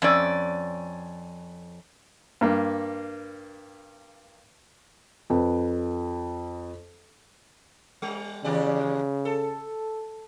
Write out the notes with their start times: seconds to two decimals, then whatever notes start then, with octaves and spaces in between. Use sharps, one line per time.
0.02 F2 C#4 D5
2.41 G2 A#3
5.30 F2 B4
8.02 G3
8.44 D#2 C#3 G4 D5
9.25 A4